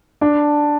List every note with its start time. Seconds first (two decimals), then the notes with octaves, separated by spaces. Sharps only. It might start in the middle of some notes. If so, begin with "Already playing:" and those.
0.21 D4